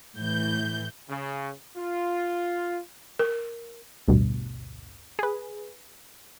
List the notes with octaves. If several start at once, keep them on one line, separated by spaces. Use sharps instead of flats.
A2 E3 G6
C#3
F4
A#4
A1 D2 G2 B2
G#4 B4